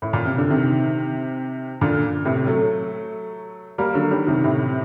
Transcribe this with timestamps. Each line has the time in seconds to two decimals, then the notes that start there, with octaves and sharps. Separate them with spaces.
0.02 A2
0.13 A#2
0.25 C3
0.38 D3
0.50 C3 D#3
1.81 A#2 D3
2.25 A2 C3
2.46 F#3 A3
3.78 G3 A#3
3.94 D3 F#3
4.11 D#3 G3
4.27 C3 D#3
4.44 A2 C3